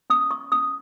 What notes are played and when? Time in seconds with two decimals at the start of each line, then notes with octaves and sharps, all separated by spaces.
0.10 C#4 D#6
0.31 C#6
0.52 C#4 D#6